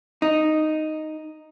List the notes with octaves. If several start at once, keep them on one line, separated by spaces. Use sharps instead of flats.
D#4